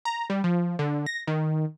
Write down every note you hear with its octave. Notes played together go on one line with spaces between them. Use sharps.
A#5
G3
F3
D3
A#6
D#3